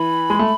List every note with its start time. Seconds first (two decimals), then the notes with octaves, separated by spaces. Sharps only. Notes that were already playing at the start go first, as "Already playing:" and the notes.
Already playing: E3 B5
0.30 G#3
0.39 A3